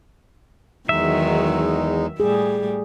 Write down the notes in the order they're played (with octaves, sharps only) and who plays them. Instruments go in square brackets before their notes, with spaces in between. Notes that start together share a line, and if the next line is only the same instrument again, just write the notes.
[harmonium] E2 G#3 D#4 [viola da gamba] D#3 F#3 [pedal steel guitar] E5
[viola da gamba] A2 G3 [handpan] G#4